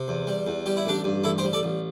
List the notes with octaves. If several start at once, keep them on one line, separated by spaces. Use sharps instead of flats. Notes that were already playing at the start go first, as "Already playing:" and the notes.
Already playing: C3
E2
G3
E2
G3 G4
E4
A1 D4 G4
G2
A1 E4 A4
G4 C5
G3
A4 D5
A1